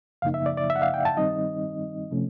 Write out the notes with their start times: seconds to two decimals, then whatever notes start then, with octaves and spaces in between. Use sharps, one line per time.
0.22 F#2 C#3 F3 A#3 D#4 F5
0.34 E5
0.46 D5
0.57 D5
0.70 E5
0.76 F#5
0.82 F5
0.94 G5
1.05 A5
1.17 G2 D#3 G3 C4 D#4 D#5
2.11 C3 F3 A3 C#4